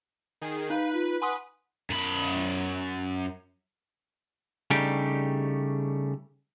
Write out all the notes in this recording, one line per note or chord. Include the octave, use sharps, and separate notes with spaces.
D#3 G#4
D#4 B4 F5
F4
B4 F#5 G#5 C6 D#6
F#2 B5
C#3 G3 A3 D4 D#4 G4